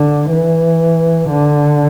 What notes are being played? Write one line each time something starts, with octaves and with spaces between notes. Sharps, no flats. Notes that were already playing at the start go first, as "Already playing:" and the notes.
Already playing: D3
E3
D3